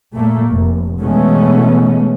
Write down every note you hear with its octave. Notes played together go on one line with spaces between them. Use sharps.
A#2 A3 A#3
F1
B2 E3 G#3 A3 B3 C#4